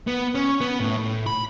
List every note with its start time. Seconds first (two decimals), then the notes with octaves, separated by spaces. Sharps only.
0.07 B3
0.35 C#4
0.61 B3
0.80 A2
0.97 A2
1.26 B5